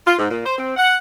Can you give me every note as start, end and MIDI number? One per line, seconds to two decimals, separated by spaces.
0.06 0.15 65
0.18 0.27 44
0.30 0.41 46
0.45 0.57 72
0.57 0.73 60
0.77 0.97 78